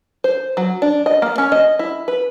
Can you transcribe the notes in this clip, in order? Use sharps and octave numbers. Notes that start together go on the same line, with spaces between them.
C5
F#3
D4
D#5
A#3
C#4
D#5
E4
B4